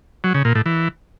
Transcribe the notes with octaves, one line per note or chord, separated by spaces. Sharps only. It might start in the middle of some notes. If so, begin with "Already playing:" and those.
F#3
C#3
A#2
A2
E3